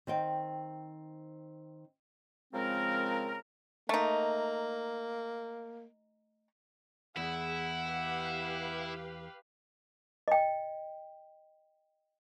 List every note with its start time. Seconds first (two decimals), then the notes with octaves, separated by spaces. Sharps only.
0.07 D#3 C4 G5
2.54 C#3 F3 G#3 C4 A#4
3.89 A3 A#3 D#4
7.17 E2 E4 G#4 F#5
7.85 G4 B4 F5
10.28 D#5 G5